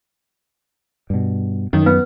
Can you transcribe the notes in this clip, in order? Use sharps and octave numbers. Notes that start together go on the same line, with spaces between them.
G2 B2
F#2 D#3
B3 B4